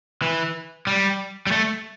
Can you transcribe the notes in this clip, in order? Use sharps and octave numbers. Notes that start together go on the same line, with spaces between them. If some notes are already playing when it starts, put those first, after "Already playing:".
E3
G3
G3
A3